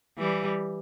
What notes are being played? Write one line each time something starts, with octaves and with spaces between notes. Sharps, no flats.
E3 G3